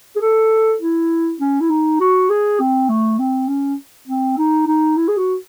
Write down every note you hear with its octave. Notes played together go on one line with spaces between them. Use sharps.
G#4
A4
E4
C#4
E4
D#4
F#4
G#4
C4
A3
C4
C#4
C4
D#4
D#4
E4
G#4
F#4